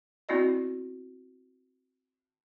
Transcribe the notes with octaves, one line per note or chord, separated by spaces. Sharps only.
B3 C4 E4 F#4 D5 D#5